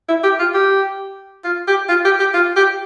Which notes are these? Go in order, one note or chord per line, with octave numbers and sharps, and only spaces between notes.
E4
G4
F4
G4
F4
G4
F4
G4
G4
F4
G4